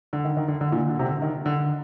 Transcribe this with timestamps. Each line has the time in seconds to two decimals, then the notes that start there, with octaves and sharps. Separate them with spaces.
0.13 D3
0.25 D#3
0.37 D#3
0.48 D3
0.61 D3
0.72 A#2
0.89 D3
0.99 C3
1.05 D3
1.22 D#3
1.46 D3